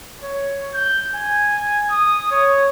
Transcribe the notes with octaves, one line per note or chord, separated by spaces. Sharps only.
C#5
G6
G#5
D#6
C#5